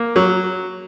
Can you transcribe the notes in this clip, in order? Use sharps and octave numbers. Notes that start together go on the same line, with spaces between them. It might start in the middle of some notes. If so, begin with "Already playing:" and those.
Already playing: A#3
F#3